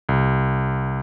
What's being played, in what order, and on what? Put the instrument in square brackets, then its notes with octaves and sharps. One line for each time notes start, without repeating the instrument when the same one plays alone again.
[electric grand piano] C2